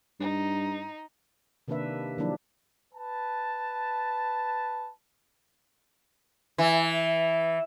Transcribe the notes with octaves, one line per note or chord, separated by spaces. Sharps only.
G2 D#4
C3 D#3 A#3 D4 B4 E5
D#3 F3 F#3 A#3 D4 E4
B4 A5
E3